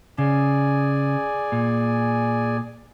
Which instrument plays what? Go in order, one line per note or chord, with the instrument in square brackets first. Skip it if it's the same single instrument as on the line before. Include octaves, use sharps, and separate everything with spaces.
[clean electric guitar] C#3 [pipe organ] G#4 D5 G#5
[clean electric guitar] A#2